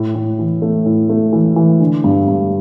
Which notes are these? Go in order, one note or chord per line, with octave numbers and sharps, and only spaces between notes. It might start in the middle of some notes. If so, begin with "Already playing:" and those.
Already playing: A2
A2
E3
A3
A2
A3
E3
E3
D3
G2
G2